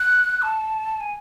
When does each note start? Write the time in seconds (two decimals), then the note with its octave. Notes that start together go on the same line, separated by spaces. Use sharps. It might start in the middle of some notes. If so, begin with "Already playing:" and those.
Already playing: F#6
0.42 A5
1.00 G#5